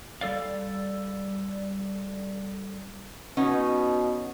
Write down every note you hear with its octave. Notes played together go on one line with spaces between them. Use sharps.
G3 A4 D5 F5
B2 B3 C#4 D#4